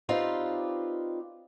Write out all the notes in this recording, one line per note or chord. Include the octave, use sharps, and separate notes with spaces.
C4 D#4 F4 G4 B4 D5